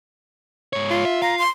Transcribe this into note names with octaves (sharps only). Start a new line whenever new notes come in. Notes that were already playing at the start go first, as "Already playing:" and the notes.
G#2 C#5
F4
E5
F5 A#5
C6